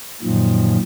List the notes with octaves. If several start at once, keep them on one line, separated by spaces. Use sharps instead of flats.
F#2 A#2 D#3 F3